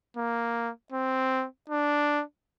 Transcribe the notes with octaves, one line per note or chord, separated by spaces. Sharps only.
A#3
C4
D4